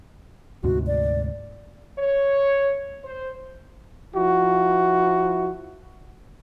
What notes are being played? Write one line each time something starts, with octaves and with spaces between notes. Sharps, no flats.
D2 G#2 C3 F#4
D5
C#5
C5
F3 E4 F#4